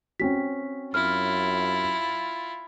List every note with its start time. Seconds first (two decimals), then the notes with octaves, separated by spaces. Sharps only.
0.20 C4 C#4 F#4 B6
0.94 F#2 E4 F4 F6